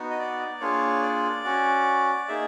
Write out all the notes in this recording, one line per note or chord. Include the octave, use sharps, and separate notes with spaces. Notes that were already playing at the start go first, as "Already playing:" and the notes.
Already playing: B3 D#4 F#4
D#5
D5
A#3 D4 F4 G#4 C#5
D5
C#4 F#4
A#3 D#4 G#4 E5